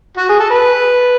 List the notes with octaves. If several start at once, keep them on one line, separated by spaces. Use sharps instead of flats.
F#4
G#4
A4
B4